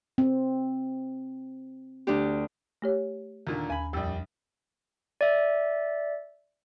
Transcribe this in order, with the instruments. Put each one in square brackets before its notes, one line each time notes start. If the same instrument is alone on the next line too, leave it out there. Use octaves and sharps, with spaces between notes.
[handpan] C4
[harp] D2 D4 G4
[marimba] A3 G4 C#5
[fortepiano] D#2 A#2 D3
[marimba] D#2 [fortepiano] G#5 B5
[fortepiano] A#1 G3 [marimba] F2 E6
[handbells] D5 E5